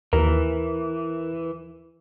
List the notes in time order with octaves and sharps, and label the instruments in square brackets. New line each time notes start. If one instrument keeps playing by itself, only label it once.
[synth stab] D#2 [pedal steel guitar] E3 [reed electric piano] A#4